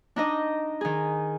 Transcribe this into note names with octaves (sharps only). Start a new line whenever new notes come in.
D4 D#4 D#5
D#3 G#4